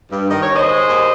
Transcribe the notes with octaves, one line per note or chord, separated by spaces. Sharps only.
G2
D#3 D#5
C#5
D#2
C5 D#5
G#3
D#2